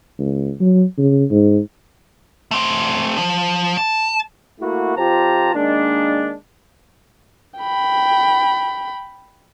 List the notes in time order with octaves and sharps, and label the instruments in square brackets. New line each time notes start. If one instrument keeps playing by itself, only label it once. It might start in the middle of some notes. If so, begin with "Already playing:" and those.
[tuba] C#2
F#3
C#3
G#2
[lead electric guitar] A3 C4
F3
A5
[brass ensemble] A3 A#3 E4 F#4
F2 F4 G4 C5 A5 A#5
D#3 G#3 A#3 D4
[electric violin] G5 B5